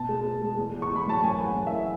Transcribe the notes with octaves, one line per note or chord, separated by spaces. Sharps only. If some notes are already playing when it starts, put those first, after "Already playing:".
Already playing: B2 A5
G#3
G#3
G#3
E2
E2
C#6
E2
B5
F#3 A5
F#2 G#5
E3 F#5
F#2
E5